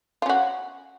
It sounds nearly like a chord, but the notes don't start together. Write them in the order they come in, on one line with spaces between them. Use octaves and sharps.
F4 C#4 F#4